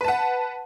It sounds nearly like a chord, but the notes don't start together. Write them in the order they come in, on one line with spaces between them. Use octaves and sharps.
B4 A5 F#5